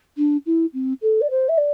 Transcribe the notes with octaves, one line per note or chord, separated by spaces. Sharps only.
D4
E4
C4
A4
D5
C5
E5
D5